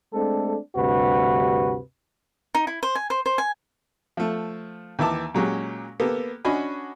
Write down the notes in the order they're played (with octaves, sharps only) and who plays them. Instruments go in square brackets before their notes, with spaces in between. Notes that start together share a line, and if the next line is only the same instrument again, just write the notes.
[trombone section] G#3 A3 C4 D4 A4
D2 G2 C3 D4 F#4 B4
[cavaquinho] D#4
E4
C5
G#5
C5
C5
G#5
[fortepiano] F3 A3
D#2 E3 E5 A5 D6
A#2 F#3 G#3 C#4 G4
A#3 B3 G4 A4
C#4 D4 F#4 D#5 G#5 B5